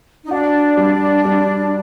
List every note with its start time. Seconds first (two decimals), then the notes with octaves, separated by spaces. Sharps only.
0.25 D#4
0.31 D4 F#4
0.77 G3
1.25 G3